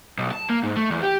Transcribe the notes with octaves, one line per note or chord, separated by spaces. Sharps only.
B1
A5
A#3
G#2
A3
E2
G4